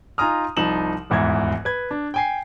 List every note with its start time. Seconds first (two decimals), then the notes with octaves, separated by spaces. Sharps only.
0.18 D#4 F4 G#5 A#5 D#6 F6
0.57 C2 F3 D#4 E7 F#7
1.10 D#1 E2 G#2 E4 G#6
1.65 B4 G#6
1.91 D4
2.14 G5 G#5 C7